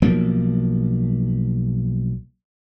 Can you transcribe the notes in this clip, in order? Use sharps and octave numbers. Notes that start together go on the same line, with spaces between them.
B1 F3 A#3